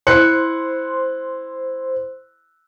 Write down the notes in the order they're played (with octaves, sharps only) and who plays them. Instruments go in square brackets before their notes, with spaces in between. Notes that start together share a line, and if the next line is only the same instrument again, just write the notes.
[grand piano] E4 F#6 C#7 [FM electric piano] C5 C6